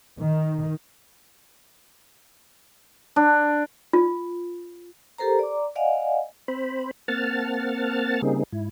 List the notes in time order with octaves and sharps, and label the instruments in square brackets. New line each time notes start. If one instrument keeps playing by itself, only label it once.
[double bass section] D#3
[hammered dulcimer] D4
[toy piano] F4
[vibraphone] G4 A4 A#4 C5 A#5
D5 A#5 D6
D5 D#5 F5 F#5 G#5
[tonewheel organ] C4 C5 B5
A#3 C4 F#5 A5 F6 A6
C#3 G3 A#3 C4 D#4 G#4
G#2 E4